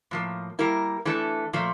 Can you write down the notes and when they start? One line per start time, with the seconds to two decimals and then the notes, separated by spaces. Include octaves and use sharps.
0.11 A2 F3 A#3
0.59 G3 A#3 E4 A#4
1.05 E3 A3 D4 A4
1.53 A#2 F3 A3